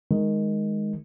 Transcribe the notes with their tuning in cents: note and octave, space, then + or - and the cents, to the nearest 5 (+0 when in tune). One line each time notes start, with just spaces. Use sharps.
D#3 +0 G#3 +0